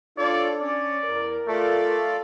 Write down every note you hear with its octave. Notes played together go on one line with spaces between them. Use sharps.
D4 F4 A4 C#5 D5
C#4 C#5 D5
E2 A#4
A3 F4 A4 D5